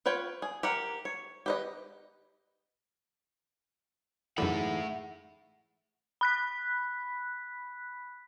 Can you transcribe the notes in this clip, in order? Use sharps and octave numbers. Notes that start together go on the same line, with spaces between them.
F4 B4 C#5 G5
G#4
G4 A#4 F#5
C#5
G4 B4 D#5
F#2 D3 E3 G#3 A3 D#4 F#5 B5
B5 F#6 B6